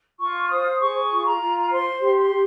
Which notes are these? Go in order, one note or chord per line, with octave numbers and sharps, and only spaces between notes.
F4 C#6
C5 D#6
G#4 C#6
F4
A#5
F4
C5 C6
G4
C6
G4